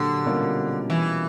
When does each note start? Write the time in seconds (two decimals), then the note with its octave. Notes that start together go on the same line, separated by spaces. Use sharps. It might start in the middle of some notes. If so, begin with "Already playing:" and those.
Already playing: A#2 D3 F#3 G4
0.25 B2 G3 A#3 C#4 F4
0.90 E3